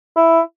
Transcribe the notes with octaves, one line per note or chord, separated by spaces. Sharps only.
E4